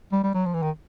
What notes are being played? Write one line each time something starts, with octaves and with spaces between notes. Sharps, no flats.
G3
G3
F#3
F3
E3
D#3